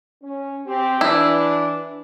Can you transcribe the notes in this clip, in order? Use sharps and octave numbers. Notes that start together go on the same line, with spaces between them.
C#4
C4 G4
E3 D4 E4